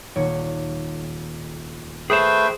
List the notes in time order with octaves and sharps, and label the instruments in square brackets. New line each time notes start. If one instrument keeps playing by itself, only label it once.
[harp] D#1 C#5 D7
[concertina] A3 B4 G5 [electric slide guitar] G#4 C5 [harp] D7